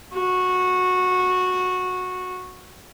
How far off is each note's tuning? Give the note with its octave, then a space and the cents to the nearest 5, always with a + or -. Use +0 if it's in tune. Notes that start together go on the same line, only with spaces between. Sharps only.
F#4 -15